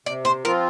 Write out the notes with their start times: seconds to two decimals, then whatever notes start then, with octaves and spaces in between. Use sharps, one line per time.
0.06 C3 D5
0.25 C5
0.44 F3 C4 F4 A#4